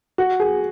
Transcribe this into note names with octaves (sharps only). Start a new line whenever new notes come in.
F#4
G#4